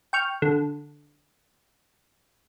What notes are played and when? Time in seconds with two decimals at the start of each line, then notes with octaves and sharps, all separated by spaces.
0.13 G5 C#6 F6
0.42 D3